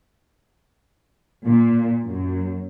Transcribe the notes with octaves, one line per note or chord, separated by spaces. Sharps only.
A#2
F#2